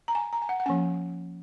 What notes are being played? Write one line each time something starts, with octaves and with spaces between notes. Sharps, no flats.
A#5
G#5
A#5
G#5
F#5
F#5
F3 A#3 C#4 G#5